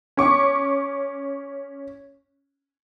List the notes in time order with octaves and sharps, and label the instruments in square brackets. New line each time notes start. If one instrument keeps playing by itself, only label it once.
[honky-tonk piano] C#4 C#6 D6